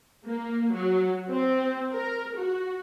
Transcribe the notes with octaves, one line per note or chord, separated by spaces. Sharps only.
A#3
F#3
C4
A#4
F#4